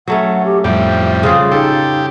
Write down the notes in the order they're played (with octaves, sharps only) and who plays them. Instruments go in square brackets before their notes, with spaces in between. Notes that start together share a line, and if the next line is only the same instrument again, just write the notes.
[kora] F#3 A3 C#4 [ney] F#5
[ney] G4
[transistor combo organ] F2 A2 G3 [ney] E5 [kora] G5
[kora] C#3 F4 G#4 [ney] F5
[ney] D#4 [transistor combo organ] G4 [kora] A4